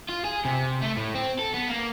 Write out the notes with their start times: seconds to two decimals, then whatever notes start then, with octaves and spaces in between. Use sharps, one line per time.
0.09 F4
0.24 G#4
0.45 C3
0.82 A3
0.97 A2
1.15 C4
1.39 A4
1.53 B3
1.68 A#3